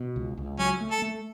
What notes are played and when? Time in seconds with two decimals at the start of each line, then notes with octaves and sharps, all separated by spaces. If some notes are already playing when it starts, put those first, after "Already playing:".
Already playing: B2
0.16 C#2
0.37 C#2
0.59 F#3 C#4
0.81 A3
0.92 A4
1.02 A3